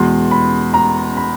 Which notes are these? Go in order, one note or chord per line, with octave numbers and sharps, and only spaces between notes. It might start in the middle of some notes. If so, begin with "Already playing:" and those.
Already playing: E2 B2 G#3 C6
B5
A#5
B5